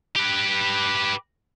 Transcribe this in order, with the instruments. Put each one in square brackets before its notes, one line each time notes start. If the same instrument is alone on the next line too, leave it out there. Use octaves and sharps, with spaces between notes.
[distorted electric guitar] G4 B4